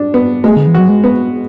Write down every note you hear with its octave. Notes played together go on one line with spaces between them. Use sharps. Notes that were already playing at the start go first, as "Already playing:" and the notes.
Already playing: D4
B3
G#3 A3
D3
E3
F#3 F#4
G#3
B3